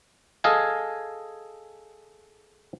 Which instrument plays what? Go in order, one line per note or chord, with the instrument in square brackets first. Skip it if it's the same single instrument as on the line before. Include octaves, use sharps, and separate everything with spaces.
[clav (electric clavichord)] G#4 A4 D#5 F5 G#5